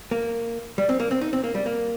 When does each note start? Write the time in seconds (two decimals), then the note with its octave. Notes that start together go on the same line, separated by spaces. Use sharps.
0.11 A#3
0.78 G3
0.89 C4
1.00 A#3
1.11 C4
1.21 D#4
1.33 C4
1.44 A#3
1.55 G3
1.66 A#3